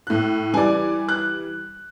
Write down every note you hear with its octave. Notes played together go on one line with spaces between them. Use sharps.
A2 F#6
E3 G3 D5 G#5 D6
F#6